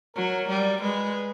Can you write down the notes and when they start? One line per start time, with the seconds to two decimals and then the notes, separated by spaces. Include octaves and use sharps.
0.16 F#3 A#4
0.49 G3
0.82 G#3 B4